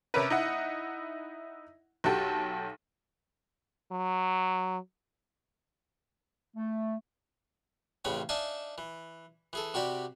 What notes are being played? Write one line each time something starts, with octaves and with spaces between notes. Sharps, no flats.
C3 C#4 A#4 B4
D#4 E4 F#5
B1 F#4 G4 A4
F#3
A3
A1 C#3 C4 B4 C#5
D4 D#4 E5 F5 G#5 A5
E3
E3 G#4 A4
C3 F#4 G4 D5 B5